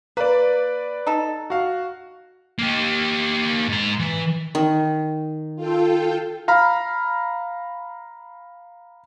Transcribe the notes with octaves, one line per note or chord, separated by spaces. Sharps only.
A#3 B4 D5
D#4 A4
F#4 F5
A#3 G4
G#2 A#5
E3
D#3
F4 A4 G5
F5 A#5 B5 F6